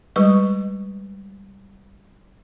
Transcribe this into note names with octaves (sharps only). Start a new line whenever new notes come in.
G3 G#3 B4 C#6